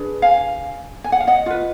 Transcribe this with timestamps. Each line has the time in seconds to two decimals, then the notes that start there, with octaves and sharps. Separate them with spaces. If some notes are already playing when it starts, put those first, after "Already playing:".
Already playing: D4 G#4 B4
0.22 F5 G#5
1.04 G#5
1.12 F#5
1.20 F5
1.27 D#5 F#5
1.46 F4 B4